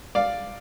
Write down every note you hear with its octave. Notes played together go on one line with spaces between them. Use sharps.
D5 F5